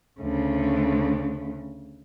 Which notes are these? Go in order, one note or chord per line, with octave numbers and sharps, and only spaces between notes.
D2 C#3